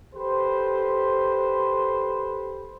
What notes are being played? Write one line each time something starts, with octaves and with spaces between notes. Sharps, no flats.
G4 A4 B4 C5